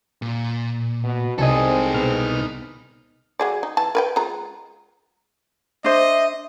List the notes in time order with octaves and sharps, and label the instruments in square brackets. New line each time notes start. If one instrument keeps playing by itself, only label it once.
[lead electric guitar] A#2
[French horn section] B2
[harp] C2 G#4 D#5 [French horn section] G#3 C4 [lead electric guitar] D#4 A4
[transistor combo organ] B2 F6
[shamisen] F#3 G#4 D5
D#4
E3 A5
A#4 B4 G5
G#3 F4 A#5
[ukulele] D4 C5 [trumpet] D#5 [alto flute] E5